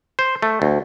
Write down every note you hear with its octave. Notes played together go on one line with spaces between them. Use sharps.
C5
A3
D2